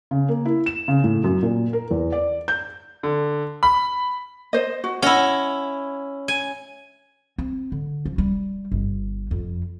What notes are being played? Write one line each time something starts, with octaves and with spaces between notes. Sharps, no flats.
C#3
A#3
E4
E7
C#3
A2
F#2
A#2
A#4
E2
D5
G6
D3
B5
C5 D#5
F#4
C#4 E4 D#5 F#5
G#5
C4
D3
F3
G3
G1
F2